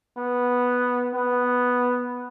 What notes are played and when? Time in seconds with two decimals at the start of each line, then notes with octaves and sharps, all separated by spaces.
0.18 B3
1.15 B3